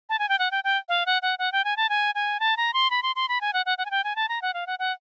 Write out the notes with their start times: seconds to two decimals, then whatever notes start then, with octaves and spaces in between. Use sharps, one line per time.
0.09 A5
0.19 G#5
0.29 G5
0.39 F#5
0.51 G5
0.64 G5
0.89 F5
1.06 F#5
1.22 F#5
1.39 F#5
1.52 G5
1.64 G#5
1.77 A5
1.89 G#5
2.15 G#5
2.40 A5
2.57 A#5
2.74 C6
2.90 B5
3.03 C6
3.16 C6
3.29 B5
3.41 G#5
3.53 F#5
3.66 F#5
3.78 F#5
3.85 G#5
3.91 G5
4.04 G#5
4.16 A5
4.29 A#5
4.42 F#5
4.54 F5
4.67 F#5
4.79 F#5